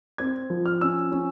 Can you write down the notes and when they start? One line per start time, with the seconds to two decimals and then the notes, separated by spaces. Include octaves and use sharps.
0.18 C4 G#6
0.50 F3
0.66 F6
0.81 C#4 E6
1.12 C#4